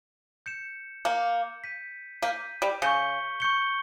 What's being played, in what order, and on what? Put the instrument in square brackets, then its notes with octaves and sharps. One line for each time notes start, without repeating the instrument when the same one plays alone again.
[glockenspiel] G6 C#7 E7
[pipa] A#3 [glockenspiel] G6 C#7 E7
[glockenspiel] G6 B6 D#7
[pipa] A#3 [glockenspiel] G6 B6 D#7
[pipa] G3
[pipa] C#3 [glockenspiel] C#6 G6 C#7 G7
[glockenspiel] C#6 G6 C#7 G7